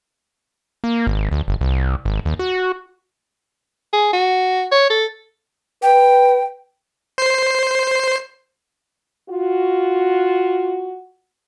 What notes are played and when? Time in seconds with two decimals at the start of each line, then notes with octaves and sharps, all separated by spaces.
0.84 A#3
1.07 G#1
1.32 D2
1.48 G1
1.61 C2
2.05 G#1
2.25 D#2
2.39 F#4
3.93 G#4
4.13 F#4
4.72 C#5
4.90 A4
5.83 B4 G5
7.18 C5 C7
9.30 F4 F#4